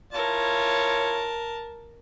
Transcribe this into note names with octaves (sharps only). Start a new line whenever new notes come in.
E4 F4 A#4 C#5 A5